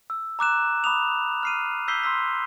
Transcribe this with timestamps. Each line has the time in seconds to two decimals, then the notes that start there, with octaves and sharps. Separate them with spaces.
0.10 E6
0.39 A#5 D6 F#6 E7
0.84 B5 D6 D#6 F7
1.43 F6 C7 D#7
1.88 E6 G6 B6 C7 G7
2.03 C6 E6 B6